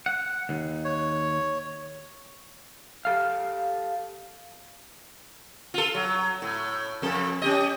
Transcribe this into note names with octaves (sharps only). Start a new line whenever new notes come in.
F#5
D#2
C#5
G4 A4 F5
F4 A4
F#3
A2
F2 A4
C#4 G4 D#5